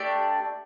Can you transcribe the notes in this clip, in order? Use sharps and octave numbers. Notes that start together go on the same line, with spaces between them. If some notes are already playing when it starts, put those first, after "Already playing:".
Already playing: A3 D4 G4 D5